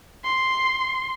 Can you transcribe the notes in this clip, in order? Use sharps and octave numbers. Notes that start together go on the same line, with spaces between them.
C6